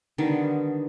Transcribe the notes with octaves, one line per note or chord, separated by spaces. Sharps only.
D3 D#3 G3 B3